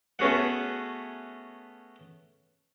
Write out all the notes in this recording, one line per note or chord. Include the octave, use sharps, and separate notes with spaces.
A3 B3 C#4 F#4 G#4 F#5